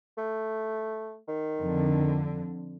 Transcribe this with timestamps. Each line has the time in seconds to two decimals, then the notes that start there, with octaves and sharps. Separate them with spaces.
0.18 A3
1.28 D#3
1.60 F2 D3